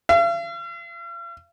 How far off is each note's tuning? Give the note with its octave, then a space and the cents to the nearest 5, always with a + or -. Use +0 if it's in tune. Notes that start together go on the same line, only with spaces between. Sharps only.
F5 -45